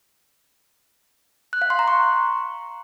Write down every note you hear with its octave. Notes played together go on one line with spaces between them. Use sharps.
F#6
F5
C6
A#5
C#6